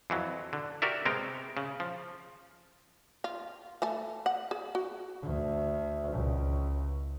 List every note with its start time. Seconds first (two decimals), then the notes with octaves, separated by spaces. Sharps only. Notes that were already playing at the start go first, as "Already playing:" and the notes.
0.10 F2 E3 F#3
0.53 D3
0.82 F#4 G4 A#4 D5 E5
1.05 C3 G#3 B3 A#4 G5
1.57 C#3
1.80 F3
3.24 F4
3.82 A3 A4 G#5
4.26 F#5
4.51 G#4
4.75 F#4
5.23 D2
6.11 C#2